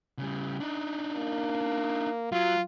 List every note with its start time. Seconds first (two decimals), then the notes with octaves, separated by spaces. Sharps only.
0.19 C#3 G3
0.60 D4 D#4
1.15 A#3
2.32 F#3 F4